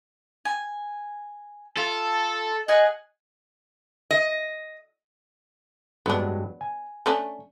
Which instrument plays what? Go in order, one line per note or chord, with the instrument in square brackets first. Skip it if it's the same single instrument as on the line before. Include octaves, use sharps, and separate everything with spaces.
[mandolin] G#5
[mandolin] F4 [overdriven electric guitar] A4
[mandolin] G#4 F#5 G#5 [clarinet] D#5
[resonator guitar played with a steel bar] D#5
[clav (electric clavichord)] G2 F#3 G#3 [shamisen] B3 D4
[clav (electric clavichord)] G#5
[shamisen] A3 C#4 D4